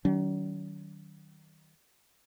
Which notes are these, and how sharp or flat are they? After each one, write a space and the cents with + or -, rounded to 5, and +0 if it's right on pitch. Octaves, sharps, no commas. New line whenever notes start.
D#3 +0 F#3 +40 C#4 +40